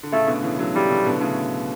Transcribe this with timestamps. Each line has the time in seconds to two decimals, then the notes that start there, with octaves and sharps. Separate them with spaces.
0.03 D3
0.12 A2 C#3 A3
0.27 B2 D3
0.43 C#3 E3
0.58 D3 F#3
0.75 C#3 E3 G3
0.90 B2 D3
1.06 B2 D3
1.21 A2 C#3